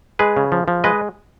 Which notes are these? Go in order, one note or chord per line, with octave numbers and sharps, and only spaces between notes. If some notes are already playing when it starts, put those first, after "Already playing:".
G#3 G#4 B4
C#3
F3
F3
G#3 B4 D#5